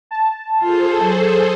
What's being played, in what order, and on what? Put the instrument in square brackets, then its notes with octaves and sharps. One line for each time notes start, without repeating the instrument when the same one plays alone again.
[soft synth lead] A5
[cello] F4 [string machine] G#4 A4 C5
[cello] F#3